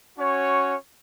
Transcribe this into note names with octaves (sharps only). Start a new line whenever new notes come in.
C#4 F#4 C#5